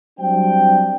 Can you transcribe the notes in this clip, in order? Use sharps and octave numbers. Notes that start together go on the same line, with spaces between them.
F#3 G3 C4 D4 C5 G5